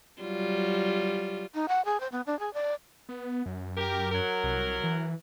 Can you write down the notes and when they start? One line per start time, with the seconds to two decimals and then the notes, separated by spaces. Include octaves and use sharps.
0.21 F#3 G3 F4
1.54 D#4
1.68 F#5
1.85 G#4
2.00 C5
2.12 B3
2.26 D4
2.39 G#4
2.54 D5
3.09 B3
3.46 F#2
3.77 G4 A#4
4.11 F#3 A#4
4.44 C2
4.84 E3